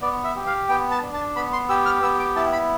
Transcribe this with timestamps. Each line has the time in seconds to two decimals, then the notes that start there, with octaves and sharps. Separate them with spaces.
0.02 B3 D5
0.24 E5
0.36 G4
0.46 F5
0.69 B3 G5
0.91 A5
1.02 D4
1.14 A5
1.36 B3 B5
1.53 C6
1.69 G4 E6
1.86 F6
2.03 B3 E6
2.19 D6
2.36 E4 A5
2.53 B5